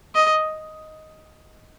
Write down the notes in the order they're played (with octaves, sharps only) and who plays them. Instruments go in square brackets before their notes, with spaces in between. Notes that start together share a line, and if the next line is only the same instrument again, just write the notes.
[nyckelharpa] D#5